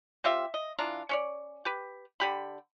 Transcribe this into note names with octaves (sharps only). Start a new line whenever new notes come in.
C4 F4 G4 E5
D#5
E3 D4 F4 A#5
C#4 C#5 D5
G4 B4
D3 G4 B5